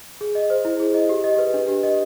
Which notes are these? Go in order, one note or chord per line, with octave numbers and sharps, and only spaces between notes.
G#4
D#5
C5
E4
G#4
D#5
G4
D#5
B4
D4
G4
D#5